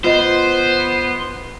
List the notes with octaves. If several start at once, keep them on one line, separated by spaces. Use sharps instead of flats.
B3 F4 C5 D#5